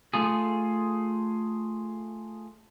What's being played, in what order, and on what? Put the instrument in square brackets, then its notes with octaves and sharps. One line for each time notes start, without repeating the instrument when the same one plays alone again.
[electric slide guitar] A3 F4 G#4